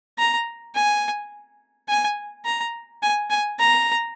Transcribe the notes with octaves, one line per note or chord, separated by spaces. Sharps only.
A#5
G#5
G#5
A#5
G#5
G#5
A#5